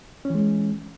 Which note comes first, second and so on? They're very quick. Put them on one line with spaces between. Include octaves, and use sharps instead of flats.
C#4 E3 G#3